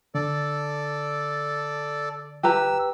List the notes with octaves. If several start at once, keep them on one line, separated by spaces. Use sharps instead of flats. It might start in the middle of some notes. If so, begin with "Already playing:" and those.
D3 A4 D5
G4 B4 A#5 E6